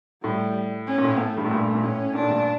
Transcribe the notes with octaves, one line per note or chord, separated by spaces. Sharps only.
A2 G3
C#4
A#2
A2
A3
G2
A2
G2 A#2
A#2
A2 C#4
A#2 D4
A2
G2 A#2